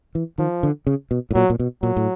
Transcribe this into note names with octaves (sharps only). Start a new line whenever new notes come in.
E3
D#3 F3
D3
C#3
B2
A2
A#2 F#3
A#2
B2
A#2 F#3
A2